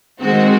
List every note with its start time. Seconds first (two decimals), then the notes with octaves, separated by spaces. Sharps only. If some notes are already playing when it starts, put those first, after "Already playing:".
0.20 D#3 G#3 C4 F#4